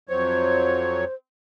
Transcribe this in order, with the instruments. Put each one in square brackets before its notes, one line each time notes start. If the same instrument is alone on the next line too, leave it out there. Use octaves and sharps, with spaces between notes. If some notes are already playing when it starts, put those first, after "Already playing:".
[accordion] F2 F#3 C#5 [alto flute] C5